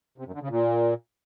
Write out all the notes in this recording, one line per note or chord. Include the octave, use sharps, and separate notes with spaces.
C3
F#2
D3
C#3
A#2